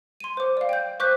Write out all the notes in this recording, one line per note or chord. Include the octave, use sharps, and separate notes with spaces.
C6 D#7
C5 D6
D5 F5
G5 G6
C5 C#6 D6 F#6 G6 B6